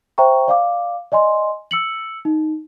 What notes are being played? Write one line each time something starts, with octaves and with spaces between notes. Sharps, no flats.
C5 E5 G5 A#5 C#6
D5 F5 D6
D5 D#5 G#5 C6
E6 C#7 F#7
D#4